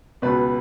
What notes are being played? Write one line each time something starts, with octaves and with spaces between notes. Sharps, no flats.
C#2 B2 B4